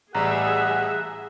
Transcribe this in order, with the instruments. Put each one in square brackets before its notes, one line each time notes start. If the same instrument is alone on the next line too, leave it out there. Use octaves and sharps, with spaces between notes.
[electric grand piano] A1 G3 [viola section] G#4 E5 [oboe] F#5 [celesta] A#5